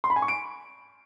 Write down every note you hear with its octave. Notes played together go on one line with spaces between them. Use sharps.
C6
B5
G#5
C#6
D7